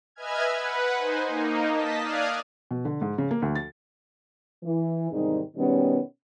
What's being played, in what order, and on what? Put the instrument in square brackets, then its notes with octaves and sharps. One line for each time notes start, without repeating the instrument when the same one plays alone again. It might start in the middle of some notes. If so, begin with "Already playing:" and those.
[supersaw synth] B4 D#5 E5 G#5 F6 G#6
B4 F#5
D#4 C5 G#5
A#3 D#4
D#5 A5 B6
D5 F5 D#6 F6 F#6 G#6
[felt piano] B2
D3
G#2
C#3
A#3
D2
A6
[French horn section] E3
E2 G#2 C3 D#3 G3 D#4
B2 D#3 G3 B3 C#4